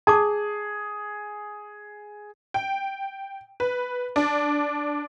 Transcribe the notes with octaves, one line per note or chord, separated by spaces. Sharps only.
G#4 A5 D6
G5
B4
D4